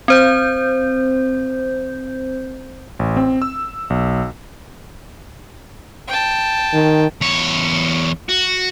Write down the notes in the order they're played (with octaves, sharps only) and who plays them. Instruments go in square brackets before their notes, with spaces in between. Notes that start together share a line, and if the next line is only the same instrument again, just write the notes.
[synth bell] C4 C5 G6
[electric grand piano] A1
C4
E6
B1
[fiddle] G5 A5
[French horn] D#3
[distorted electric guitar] E2 C#5
F#4